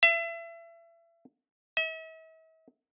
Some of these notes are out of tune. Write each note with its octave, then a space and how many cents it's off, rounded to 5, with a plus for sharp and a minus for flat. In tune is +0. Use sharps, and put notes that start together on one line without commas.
E5 +30
E5 -45